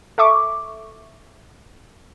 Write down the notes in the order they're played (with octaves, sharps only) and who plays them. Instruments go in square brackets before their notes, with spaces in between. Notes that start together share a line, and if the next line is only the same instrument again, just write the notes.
[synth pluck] A4 E5 C#6 D6